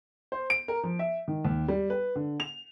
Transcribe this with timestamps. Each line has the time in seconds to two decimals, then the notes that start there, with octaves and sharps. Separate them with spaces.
0.32 C5
0.50 D7
0.68 A#4
0.83 F3
0.99 E5
1.28 D#3
1.45 D#2
1.68 G3
1.90 B4
2.15 D3
2.40 F7